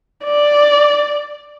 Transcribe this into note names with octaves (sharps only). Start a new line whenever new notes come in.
D5